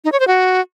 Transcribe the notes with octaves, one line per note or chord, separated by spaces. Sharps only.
D#4
C#5
C5
F#4